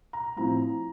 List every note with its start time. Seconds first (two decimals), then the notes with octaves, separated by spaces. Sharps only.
0.13 A#5
0.36 A2 F3 C4 E4 A#5